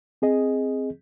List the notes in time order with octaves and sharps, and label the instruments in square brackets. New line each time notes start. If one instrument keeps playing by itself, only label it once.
[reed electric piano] C4 G#4 D#5